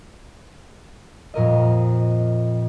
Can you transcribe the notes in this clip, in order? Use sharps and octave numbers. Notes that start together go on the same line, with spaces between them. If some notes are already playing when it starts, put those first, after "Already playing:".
F2 A#2 A#4 D#5